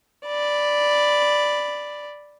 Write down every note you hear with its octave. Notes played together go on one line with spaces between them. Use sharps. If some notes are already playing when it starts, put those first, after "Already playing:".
D5 B5